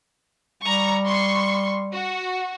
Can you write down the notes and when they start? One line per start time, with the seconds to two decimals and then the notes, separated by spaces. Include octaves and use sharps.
0.63 G3 A#5 C#6
1.06 C6 C#6
1.93 F#4